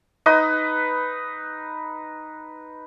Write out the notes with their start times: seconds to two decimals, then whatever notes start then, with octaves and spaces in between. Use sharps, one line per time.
0.26 D#4 B4 D#5 D#6